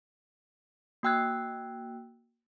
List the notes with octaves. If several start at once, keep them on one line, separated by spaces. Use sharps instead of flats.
A#3 F#4 G5 E6 F#6 G#6